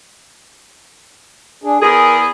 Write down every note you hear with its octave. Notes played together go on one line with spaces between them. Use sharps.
D4 G#4
E2 G#4 A#4